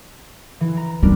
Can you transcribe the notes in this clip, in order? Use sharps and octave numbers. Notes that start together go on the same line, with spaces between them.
E3
A#5
G3 D4 A#4 B4